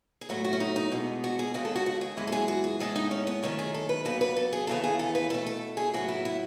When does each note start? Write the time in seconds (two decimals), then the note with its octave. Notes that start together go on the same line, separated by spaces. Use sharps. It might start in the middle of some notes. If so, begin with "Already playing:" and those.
0.21 G#4
0.29 A2 F#3 A3 F#4
0.44 F#4
0.53 C#4
0.60 D#4
0.76 D#4
0.92 E2 B2 G#3 B3
1.24 F#4
1.39 G#4
1.54 D#2 C#3 G#3 B3 F#4
1.65 A4
1.75 F#4
1.86 F#4
2.01 G#4
2.17 F#2 E3 G#3 B3 B4
2.27 A4
2.32 G#4
2.48 F#4
2.64 G#4
2.79 A2 G#3 B3 A4
2.96 D#4
3.11 C#4
3.27 B3
3.42 F#2 D#3 A3 C#4
3.59 G#4
3.74 A4
3.89 B4
4.05 E2 C#3 F#3 B3 B4
4.21 B4
4.36 A4
4.53 G#4
4.67 D#2 C#3 E3 B3 A4
4.83 G#4
4.99 A4
5.15 B4
5.30 B2 A3 A4
5.46 A4
5.77 G#4
5.94 A2 F#3 B3 F#4
6.08 E4
6.25 E4